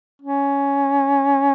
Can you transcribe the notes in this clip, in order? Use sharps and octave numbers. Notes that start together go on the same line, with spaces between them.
C#4